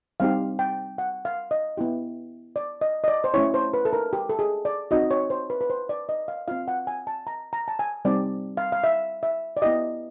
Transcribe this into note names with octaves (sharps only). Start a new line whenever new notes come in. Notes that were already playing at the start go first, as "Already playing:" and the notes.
G3 C4 D#4 G4 F5
G5
F#5
F5
D#5
B3 E4 G4
D5
D#5
D#5
D5
C5
A3 C#4 E4 C#5
C5
B4
A4
A#4
G4
A4
G#4
D5
C4 D#4 F#4 D#5
C#5
C5
B4
B4
C5
D5
D#5
F5
C4 F4 F5
F#5
G#5
A5
A#5
A#5
A5
G#5
G3 C4 D#4 G4 D5
F5
F5
E5
E5
D5
B3 E4 G4 D#5